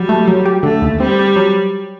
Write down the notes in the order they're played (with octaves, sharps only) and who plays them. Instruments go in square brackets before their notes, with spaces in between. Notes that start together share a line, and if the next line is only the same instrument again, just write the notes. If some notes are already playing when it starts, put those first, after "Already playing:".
Already playing: [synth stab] F#3 [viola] G3
[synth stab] A3
F#3
G4
[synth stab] D3 [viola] A3
[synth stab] D#2
[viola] G3 [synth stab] C4
[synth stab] G4
F#3